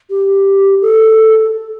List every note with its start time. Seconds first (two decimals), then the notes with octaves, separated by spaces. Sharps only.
0.10 G4
0.82 A4